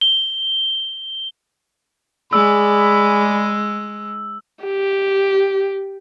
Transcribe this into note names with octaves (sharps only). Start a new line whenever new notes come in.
G7
G#3 G#4 D5 B5 E6
G4